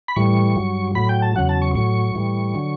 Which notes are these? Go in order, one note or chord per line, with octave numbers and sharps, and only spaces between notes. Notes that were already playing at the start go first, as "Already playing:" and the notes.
B5
A2 E3 G3 C#6
G2 F#3
A2 F#3 B5
G5
A5
E2 C#3 F#3 F#5
A5
C#6
A2 F#3 C#6
A2 E3 G3
D3 F#3